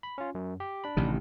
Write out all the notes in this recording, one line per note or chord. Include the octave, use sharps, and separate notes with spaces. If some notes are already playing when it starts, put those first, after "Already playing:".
B5
C#4 F4
F#2
G4
D4 B5
A1 C3 D#3